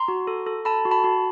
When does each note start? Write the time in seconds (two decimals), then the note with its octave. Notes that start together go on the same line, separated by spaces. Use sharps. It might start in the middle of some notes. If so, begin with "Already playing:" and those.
Already playing: A#5 C6
0.08 F#4
0.27 A4
0.47 A4
0.65 A4 A5 B5
0.85 F#4
0.91 A5 B5
1.04 F#4